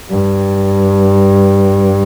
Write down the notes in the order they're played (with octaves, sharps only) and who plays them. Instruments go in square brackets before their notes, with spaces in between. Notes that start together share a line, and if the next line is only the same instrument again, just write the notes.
[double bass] G2